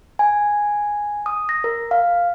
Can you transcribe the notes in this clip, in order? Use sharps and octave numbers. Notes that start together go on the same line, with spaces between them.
G#5
D#6
A#6
A#4
F5